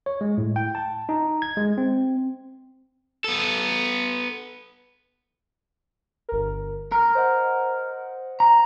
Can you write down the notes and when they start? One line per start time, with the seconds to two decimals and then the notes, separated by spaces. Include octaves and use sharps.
0.06 C#5
0.21 G#3
0.38 A2
0.56 G5
0.75 A5
1.09 D#4
1.42 G#6
1.57 G#3
1.78 C4
3.24 B3 A4
6.29 G1 A#4
6.92 A#4 F6
7.15 C5 D#5 F#5
8.40 A#5